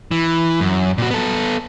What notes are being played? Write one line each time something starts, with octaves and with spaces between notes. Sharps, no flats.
E3
F#2
A#2 F#4
B3 A4